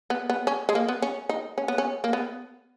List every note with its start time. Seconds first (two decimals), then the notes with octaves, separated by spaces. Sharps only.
0.10 B3
0.30 B3
0.47 C#4
0.69 G#3
0.75 A#3
0.88 B3
1.02 C#4
1.29 D#4
1.58 C#4
1.68 B3
1.78 C#4
2.04 A#3
2.13 B3